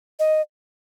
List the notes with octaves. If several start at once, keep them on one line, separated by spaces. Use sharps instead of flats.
D#5